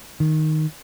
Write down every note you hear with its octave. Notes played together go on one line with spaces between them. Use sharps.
D#3